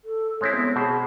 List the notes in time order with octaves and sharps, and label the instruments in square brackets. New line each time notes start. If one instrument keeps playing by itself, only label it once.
[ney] A4
[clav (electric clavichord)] G#3 C4 E4 [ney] C#5
[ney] B3
[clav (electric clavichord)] B2 C5 [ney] G#4